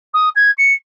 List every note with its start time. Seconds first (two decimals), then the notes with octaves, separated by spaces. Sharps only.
0.13 D#6
0.35 G#6
0.58 C#7